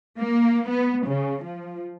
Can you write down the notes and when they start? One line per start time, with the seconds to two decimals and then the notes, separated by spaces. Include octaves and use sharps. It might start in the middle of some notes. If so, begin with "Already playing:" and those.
0.20 A#3
0.69 B3
1.07 C#3
1.43 F3